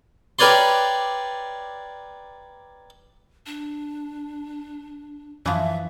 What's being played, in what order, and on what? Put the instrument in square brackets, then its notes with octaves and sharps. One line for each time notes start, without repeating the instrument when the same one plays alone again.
[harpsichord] G4 A#4 B4 C#5 D5 C6
[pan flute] D4
[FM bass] F#2 [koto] E3 F3 [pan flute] E5